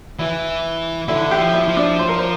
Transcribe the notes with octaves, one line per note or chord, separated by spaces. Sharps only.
E3 E4
D3 E4
G4
F3
E4
F3
D4
C5
A#4
C5